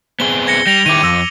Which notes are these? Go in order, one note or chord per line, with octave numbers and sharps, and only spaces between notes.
B3 C4 G#4 G7
G#6 A#6 C#7
G3 A#6 F7
D#3 E4 G4 D6 D#7
F2 D6 E6 A#6